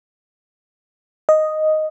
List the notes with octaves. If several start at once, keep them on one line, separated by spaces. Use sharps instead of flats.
D#5